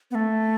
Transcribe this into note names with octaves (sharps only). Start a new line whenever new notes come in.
B3
A3